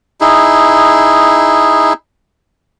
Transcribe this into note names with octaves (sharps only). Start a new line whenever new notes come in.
D#4 E4 G#4